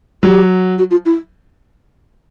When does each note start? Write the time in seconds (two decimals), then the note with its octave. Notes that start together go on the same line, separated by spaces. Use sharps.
0.23 F#3 G4
0.78 F#4
0.91 F4
1.05 E4